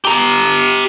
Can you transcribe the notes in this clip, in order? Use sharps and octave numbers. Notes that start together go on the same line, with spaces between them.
G4 A#5